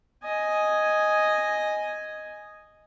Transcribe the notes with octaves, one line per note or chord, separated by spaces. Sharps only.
D#5 G#5